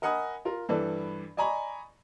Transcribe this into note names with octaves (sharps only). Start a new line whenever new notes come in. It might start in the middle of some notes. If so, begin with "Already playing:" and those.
A#4 D#5 F#5 G#5 B5 D#6
F4 A#4
G2 E3 A4 B4 D5
D5 D#5 G#5 A#5 B5 C#6